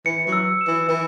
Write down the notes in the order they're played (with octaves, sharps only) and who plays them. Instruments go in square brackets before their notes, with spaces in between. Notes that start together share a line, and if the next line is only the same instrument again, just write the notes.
[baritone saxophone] E3 [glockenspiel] C#7
[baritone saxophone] F#3
[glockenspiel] E6
E7
[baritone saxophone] E3
[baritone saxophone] E3 [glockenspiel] E6